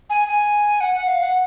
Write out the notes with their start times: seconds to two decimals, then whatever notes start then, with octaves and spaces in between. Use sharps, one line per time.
0.10 G#5
0.28 G#5
0.81 F#5
0.95 F#5
1.07 F5
1.21 F#5